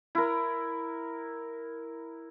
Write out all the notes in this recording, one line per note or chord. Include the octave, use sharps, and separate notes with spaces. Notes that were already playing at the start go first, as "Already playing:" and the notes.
E4 A#4